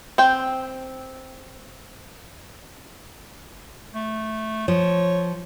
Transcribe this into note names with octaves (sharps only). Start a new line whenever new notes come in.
C4 G5
A3
F3 C#5